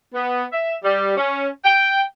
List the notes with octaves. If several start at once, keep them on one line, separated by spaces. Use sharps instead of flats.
B3
E5
G3
C#4
G5